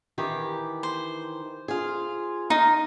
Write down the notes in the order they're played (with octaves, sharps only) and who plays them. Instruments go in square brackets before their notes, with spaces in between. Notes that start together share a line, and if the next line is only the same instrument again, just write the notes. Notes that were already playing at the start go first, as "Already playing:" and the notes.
[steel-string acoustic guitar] D#3 E3 G4
[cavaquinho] C5
[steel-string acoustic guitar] F4 G#4
[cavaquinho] D#4 [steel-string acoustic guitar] F5